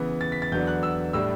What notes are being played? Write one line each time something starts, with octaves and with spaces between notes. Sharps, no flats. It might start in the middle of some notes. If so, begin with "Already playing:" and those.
Already playing: C#3 E3 B3
A6
B6
A6
E2 D3 F#3 B3 D4 G6
F#6
E6
A2 G3 D4 E6